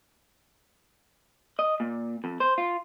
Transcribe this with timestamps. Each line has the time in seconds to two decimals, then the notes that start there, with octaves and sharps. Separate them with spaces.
1.59 D#5
1.80 A#2
2.24 F2
2.40 C5
2.58 F4